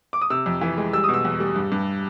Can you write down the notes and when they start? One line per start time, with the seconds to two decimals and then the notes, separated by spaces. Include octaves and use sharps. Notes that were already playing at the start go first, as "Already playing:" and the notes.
0.13 D6
0.21 D#6
0.30 C3 E6
0.46 F2
0.61 E3
0.77 G#3
0.93 G3 E6
1.04 B2 D#6
1.14 E6
1.25 E2
1.40 G3
1.56 G2
1.72 G2